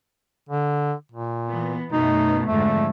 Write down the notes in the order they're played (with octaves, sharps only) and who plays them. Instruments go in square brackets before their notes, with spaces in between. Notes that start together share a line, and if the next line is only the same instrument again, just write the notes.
[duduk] D3
A#2
[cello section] E3 B3
[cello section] F#2 B2 A3 [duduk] D#4
[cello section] F2 G#2 D3 [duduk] A3